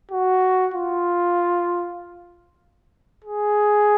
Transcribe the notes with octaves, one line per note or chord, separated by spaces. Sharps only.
F#4
F4
G#4